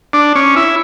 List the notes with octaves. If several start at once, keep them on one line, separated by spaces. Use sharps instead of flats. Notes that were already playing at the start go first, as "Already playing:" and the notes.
D4
C#4
E4